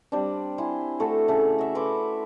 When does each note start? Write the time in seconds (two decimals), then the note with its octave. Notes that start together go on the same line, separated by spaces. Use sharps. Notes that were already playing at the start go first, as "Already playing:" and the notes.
0.12 G3 C4 D4
0.58 E4 G#5 C6
1.00 A3 F#4 A4
1.28 C#3 A3
1.58 F#4 E5
1.75 E4 B4 C6 D6